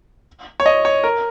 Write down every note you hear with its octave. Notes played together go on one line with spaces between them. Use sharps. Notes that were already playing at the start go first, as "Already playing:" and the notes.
C#5
D#5
C#5
A#4